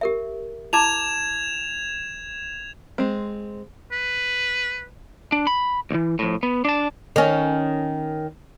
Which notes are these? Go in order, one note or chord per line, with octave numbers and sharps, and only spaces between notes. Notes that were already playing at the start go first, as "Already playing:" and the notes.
G4 A#4 E5
E4 A5 D6 G#6 E7 F7
G#3 C4
B4
D4
B5
B1 E3
A2 F3
B3
D4 A5
D#3 C#4